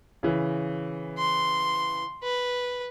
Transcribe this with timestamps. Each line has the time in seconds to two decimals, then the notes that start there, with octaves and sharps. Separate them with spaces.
0.23 C#3 E3
1.18 C6
2.23 B4